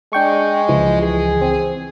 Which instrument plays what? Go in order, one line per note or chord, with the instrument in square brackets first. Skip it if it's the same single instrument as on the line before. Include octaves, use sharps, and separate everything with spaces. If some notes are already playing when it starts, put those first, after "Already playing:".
[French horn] G#3 [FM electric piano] D4 G5 C#6
[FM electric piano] C#2 E3 F3
[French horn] G#4
[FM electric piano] C4